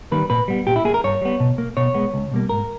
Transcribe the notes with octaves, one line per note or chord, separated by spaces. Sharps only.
D#3 G3 A#3 B4
A#2 B4
G3 B3
A#2 G4
E4
A#3 G#4
A#4
G2 C#5
G3 B3
B2
A#3
B2 C#5
G#3 B3
C#2
B2 G3 A#3
G#2 A#4